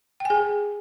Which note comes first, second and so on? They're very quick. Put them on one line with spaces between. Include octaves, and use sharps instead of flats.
G5 G#5 G#4